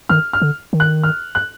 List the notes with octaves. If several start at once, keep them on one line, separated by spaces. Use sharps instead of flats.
D#3 F6
F6
D3
D#3
F#6
F6
F#6